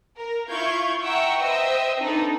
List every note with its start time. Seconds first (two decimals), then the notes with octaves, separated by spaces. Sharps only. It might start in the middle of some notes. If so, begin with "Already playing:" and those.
0.17 A#4
0.50 E4 F4 F5 C#6 G6 G#6
1.02 E5 F#5 G5 A#5 C#6 E6
1.43 B4 C5 D#5 E5 G5 E6
1.99 C4 D4 D#4 A4 B4